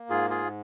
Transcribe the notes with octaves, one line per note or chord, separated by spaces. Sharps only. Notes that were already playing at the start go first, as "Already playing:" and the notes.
Already playing: A#3
G#2 F4 G#4
F4 G#4